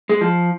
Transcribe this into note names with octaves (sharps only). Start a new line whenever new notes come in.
G#3
F3